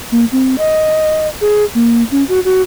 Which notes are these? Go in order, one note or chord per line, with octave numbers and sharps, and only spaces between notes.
A#3
C4
D#5
G#4
A#3
C#4
F#4
F#4